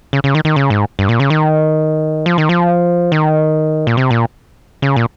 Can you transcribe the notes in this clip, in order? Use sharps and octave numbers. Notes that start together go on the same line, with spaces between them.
C#3
C#3
D#3
D#3
C#3
G#2
G2
A#2
C#3
D#3
F3
D#3
F3
D#3
A#2
C3
A#2
C#3
A#2